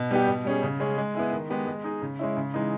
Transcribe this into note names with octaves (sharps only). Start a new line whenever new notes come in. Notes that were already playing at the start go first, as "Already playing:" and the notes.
Already playing: B2
G3 B3 G4
B2
G3 C#4 G#4
C#3
G#3 C#4 G#4
G#3
B3 E4 G#4
D#3
G#3 B3 G4
G#3
D#4 G#4
C#3
G#3 C#4 E4
C#3
E3 G#3 D#4